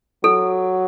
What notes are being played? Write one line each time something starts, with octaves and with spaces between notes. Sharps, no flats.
F#3 A4